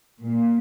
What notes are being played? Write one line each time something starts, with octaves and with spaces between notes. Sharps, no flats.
A#2